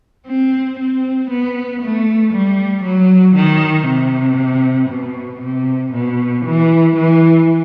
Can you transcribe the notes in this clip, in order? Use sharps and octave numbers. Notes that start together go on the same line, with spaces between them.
C4
C4
B3
A3
G3
F#3
D#3
C3
B2
C3
B2
E3
E3